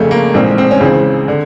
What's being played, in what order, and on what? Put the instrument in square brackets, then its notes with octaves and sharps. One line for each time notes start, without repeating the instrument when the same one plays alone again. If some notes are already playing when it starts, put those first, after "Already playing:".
Already playing: [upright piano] F1 F2 C#3 A3
A#3
A#1 G#2 E3 C4
C4
C#4
C#2 C#3 E3 C4
D3